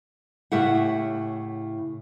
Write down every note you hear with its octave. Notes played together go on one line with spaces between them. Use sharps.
A2 C#3 E4 G4 E5 F#5